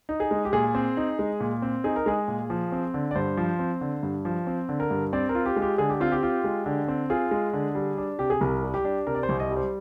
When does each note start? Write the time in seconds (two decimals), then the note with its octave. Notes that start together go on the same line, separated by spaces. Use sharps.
0.09 D#4
0.20 G#4
0.31 G#3
0.45 G4
0.53 A#2 G#4
0.75 C4
0.97 D#4
1.19 G#3
1.40 A#2
1.62 C4
1.84 D#4 G#4
1.96 A#4
2.06 G#3 G#4
2.28 A#2
2.50 F3
2.72 C4
2.94 D3
3.11 D5
3.15 G2 C5
3.37 F3
3.59 C4
3.81 D3
4.03 G2
4.25 F3
4.47 C4
4.69 D3
4.80 A#4
4.91 G2
5.13 C4 D5
5.29 A#4
5.35 F4
5.46 G4
5.56 G#3
5.62 G4
5.78 D3 G#4
5.89 G4
6.00 C4 F4
6.12 G4
6.23 F4
6.44 G#3
6.66 D3
6.88 C4
7.10 F4 G#4
7.31 G#3
7.53 D3
7.75 G3
7.98 D4
8.19 C3 G4
8.30 G#4
8.41 C2 A#4
8.63 G3
8.74 G4
8.85 D4
9.07 C3 A#4
9.15 D5
9.23 C5
9.29 C2
9.40 D#5
9.51 G3
9.57 C5